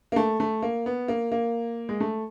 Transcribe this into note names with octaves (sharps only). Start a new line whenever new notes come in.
A#3
A3
A3
A#3
B3
A#3
A#3
G#3
A3